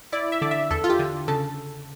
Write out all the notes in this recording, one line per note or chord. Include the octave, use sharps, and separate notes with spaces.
E4 D5
E5
D3 D5
E5
E2 A4
F4
G4
D3
C#3 A4